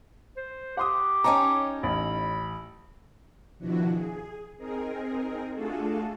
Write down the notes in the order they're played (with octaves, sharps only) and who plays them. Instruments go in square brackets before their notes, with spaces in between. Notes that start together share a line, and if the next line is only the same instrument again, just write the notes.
[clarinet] C5
[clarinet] G4 [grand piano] F#5 C6 D#6
[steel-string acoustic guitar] C#4 D#4 C#5 [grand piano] G5 A5 A#5
[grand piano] A1 [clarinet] B5
[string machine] B2 D#3 F3 D4 E4 F#4
G#4
C4 D#4 G#4 A#4
A3 D4 F4 F#4 G#4 A4